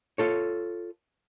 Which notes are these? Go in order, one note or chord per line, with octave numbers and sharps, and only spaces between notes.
F4 A4 C#5